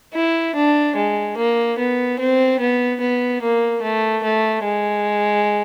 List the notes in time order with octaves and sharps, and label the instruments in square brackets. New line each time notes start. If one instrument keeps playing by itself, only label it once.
[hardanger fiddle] E4
D4
G#3
A#3
B3
C4
B3
B3
A#3
A3
A3
G#3